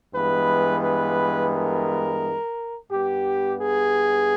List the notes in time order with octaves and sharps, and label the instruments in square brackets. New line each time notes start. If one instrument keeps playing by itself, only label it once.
[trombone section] G2 E3 G#3 B3 B4
B4
A#4
G2 G3 B3 G4
G#4